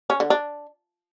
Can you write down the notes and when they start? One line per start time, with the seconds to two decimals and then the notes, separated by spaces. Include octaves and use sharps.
0.10 C#4
0.20 D3
0.30 D4